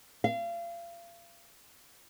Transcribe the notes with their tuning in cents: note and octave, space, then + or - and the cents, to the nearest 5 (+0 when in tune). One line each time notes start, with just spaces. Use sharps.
F5 -35